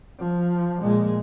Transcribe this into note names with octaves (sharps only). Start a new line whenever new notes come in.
F3
A#2 G#3